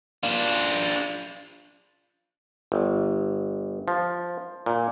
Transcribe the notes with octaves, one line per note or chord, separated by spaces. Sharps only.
D4 F4
G1
F3
A#2